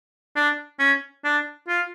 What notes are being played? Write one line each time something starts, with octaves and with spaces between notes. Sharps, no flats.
D4
C#4
D4
F4